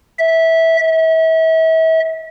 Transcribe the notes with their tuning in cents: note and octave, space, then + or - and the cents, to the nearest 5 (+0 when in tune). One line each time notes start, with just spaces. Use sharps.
E5 -15
E5 -35